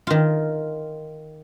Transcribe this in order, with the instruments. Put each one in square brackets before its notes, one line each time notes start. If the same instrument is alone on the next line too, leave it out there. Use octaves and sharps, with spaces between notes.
[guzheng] D#3 F4